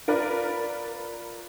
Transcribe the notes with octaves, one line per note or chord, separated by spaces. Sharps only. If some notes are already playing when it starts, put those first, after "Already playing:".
F4 A#4 B4 D5